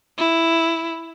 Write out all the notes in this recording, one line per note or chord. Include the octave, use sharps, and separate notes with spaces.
E4